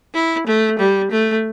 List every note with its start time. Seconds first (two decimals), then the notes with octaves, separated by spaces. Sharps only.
0.14 E4
0.47 A3
0.79 G3
1.11 A3